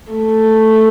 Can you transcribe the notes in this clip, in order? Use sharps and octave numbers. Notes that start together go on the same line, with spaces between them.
A3